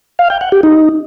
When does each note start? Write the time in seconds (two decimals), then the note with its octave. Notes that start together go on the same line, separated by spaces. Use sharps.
0.19 F5
0.30 G5
0.41 F#5
0.52 G4
0.63 D#4